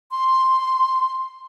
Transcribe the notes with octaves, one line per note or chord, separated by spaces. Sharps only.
C6